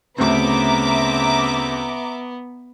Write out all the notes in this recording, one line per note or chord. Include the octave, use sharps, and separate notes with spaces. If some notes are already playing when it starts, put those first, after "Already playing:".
D2 C#3 B3 C4 E5 A#5 D6